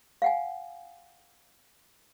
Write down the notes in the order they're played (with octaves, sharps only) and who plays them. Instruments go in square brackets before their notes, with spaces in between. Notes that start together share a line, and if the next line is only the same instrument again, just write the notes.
[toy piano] F5 F#5 G#5